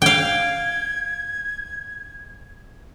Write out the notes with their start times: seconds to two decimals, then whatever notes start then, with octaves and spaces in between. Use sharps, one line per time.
0.02 F5 G5 G#6